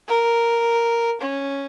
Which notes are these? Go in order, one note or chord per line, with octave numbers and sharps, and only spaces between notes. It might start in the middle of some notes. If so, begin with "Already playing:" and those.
A#4
C#4